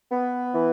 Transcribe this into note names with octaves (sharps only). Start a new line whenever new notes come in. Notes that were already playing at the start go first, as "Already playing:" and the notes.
B3
E3